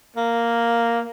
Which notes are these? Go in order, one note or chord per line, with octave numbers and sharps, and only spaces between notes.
A#3